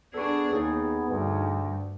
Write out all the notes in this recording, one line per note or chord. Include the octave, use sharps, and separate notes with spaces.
B3 D4 G#4 A4 C#6
D#2 B3 D#4 G#4 C#5
D2 G2